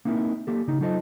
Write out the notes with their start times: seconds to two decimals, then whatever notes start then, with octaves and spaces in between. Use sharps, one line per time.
0.05 A#3 C4 D#4 E4 A#4
0.47 A#3 G4 A4
0.67 C#3 D#4
0.81 F#3 D#4 F4 A4 C5 D#5